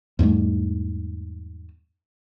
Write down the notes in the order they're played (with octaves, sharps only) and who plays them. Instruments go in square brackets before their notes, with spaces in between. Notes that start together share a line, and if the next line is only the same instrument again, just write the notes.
[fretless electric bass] E2 G#2 G3 A3